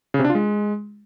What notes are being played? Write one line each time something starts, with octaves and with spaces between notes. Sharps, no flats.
C#3
C3
D4
F4
G#3